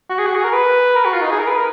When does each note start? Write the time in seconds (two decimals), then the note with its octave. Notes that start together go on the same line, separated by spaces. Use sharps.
0.09 F#4
0.18 G#4
0.26 F#4
0.35 G#4
0.44 A#4
0.53 B4
0.96 A#4
1.05 F#4
1.14 F4
1.21 D#4
1.31 G#4
1.39 A#4
1.47 B4
1.57 A#4